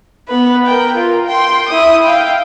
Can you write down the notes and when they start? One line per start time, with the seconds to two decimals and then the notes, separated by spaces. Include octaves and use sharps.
0.28 B3 B4
0.67 A#4 G5
0.96 F4 A#4
1.27 G5 C6
1.69 E4 D#6
2.04 F5 G5